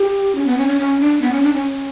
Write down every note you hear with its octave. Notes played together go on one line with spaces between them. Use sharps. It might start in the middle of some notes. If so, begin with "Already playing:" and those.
Already playing: G4
C#4
B3
C#4
C#4
C#4
D4
B3
C#4
D4
C#4